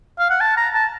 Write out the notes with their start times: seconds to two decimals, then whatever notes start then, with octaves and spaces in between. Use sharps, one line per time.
0.19 F5
0.30 F#5
0.41 A5
0.57 A#5
0.74 A5